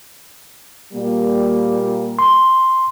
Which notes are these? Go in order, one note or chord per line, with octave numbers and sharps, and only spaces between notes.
A#2 G3 A#3
C6